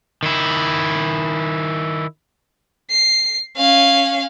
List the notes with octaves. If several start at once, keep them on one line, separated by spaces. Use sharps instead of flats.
D#3 E4
C7
C#4 F5